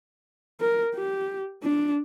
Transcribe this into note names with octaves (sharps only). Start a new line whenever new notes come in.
A#4
G4
D4